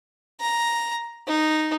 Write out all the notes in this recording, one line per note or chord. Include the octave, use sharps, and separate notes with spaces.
A#5
D#4